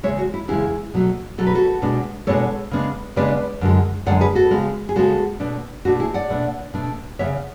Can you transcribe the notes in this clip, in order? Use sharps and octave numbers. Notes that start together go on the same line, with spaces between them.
E2 C#3 G#3 C#5 E5
F#4
E4
E2 C#3 G#3 E4 G#4
B2 F#3 A3
B2 F#3 A3 A4
B4
F#4 A4
B2 G#3 B3 D4
B2 G#3 B3 D4 A4 C#5
C#3 G#3 B3 D4
C#3 G#3 B3 D4 B4 D5
F#2 D3 G#3
F#2 D3 G#3 D5 F#5
G#4 B4
F#4 A4
C#3 G#3 B3
G#4
C#3 G#3 B3 F#4 A4
B2 A3 D4
B2 A3 D4 F#4
E4 G#4
D5 F#5
B2 A3 D4
B2 A3 D4
C#3 E3 B3 C#5 E5